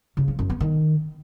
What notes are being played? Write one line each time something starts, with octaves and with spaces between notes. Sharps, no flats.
C#3
F3
F#2
B3
D#3